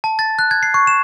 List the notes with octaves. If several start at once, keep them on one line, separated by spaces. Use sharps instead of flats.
A5
A6
F#6
G#6
C7
C#6
E7